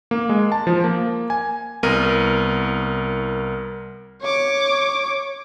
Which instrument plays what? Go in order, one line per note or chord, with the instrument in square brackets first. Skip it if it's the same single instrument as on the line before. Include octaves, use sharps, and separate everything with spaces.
[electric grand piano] A#3
G#3
A5
F3
A#3
G#5
C2 B3 A#4 D#7
[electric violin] C#5 D6